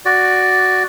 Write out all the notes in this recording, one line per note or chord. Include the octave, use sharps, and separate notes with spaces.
F#4 D5